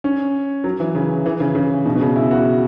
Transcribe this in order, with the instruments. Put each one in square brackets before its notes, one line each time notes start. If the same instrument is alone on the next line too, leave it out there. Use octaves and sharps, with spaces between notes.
[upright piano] C#4
F#3
E3
C#3
E3
C#3
C#3
B2
B2
C#3
E4
F#4